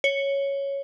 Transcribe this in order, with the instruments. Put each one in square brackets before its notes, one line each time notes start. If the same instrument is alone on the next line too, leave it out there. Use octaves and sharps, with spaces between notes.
[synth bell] C#5